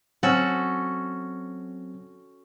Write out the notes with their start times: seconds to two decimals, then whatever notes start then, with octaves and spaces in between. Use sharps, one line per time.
0.23 F#3 C4 C#4 F#4 A4